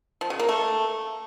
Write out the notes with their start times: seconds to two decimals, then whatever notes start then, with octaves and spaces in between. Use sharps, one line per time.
0.21 F3
0.30 C#3
0.39 A#3
0.49 A3